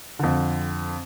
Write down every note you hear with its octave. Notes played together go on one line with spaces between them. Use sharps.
F2 D3